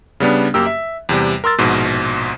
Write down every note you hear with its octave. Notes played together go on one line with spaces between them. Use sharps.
C#3 G3 B3 D4
F#2 A#3 G4 E6
E5
E2 C3 G3
A#4 C6 E6 A6
A#1 G#2 B2